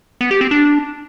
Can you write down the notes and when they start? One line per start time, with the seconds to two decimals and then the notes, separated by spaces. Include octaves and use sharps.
0.21 B3
0.31 G4
0.41 C4
0.51 D4